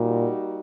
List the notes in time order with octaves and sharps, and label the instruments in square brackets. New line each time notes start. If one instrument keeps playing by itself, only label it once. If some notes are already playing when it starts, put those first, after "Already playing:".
Already playing: [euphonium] A#2 [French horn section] G3 A#3 D#4 F#4